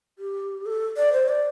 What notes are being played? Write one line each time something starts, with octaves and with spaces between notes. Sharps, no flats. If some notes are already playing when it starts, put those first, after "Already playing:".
G4
A4
D5
C5
D5